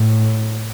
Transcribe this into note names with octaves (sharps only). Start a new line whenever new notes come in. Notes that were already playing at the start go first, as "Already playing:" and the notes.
Already playing: A2